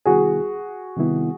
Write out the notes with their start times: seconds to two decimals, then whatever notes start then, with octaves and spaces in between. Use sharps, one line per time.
0.06 C3 D#3 G3 B3 E4 F#4 G#4
0.97 C3 D#3 G3 B3 E4